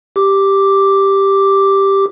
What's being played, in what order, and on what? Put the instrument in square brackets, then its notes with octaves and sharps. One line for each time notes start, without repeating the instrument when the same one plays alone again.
[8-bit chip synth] G4 D6